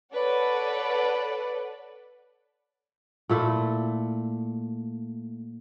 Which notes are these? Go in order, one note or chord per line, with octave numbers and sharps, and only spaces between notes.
A4 B4 C#5 D5 F#5
A#2 A3 E4